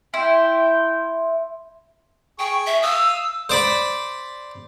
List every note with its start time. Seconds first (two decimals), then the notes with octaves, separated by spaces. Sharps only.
0.14 E4 E5 G5 C6
2.39 G#4 G5 C#6
2.67 E5
2.82 F5 D#6 E6
3.49 C5 D5 B5